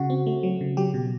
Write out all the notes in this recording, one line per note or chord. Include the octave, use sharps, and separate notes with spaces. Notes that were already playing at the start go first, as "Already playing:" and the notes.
Already playing: C#3 F#4
C4
A3
F#3
C#3
F#3 G4
B2